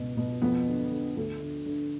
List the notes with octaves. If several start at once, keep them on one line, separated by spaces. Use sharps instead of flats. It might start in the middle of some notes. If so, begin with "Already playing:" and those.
Already playing: C#2 B2
B2
F2 B3
D3
D3
D2 A3
D3
D3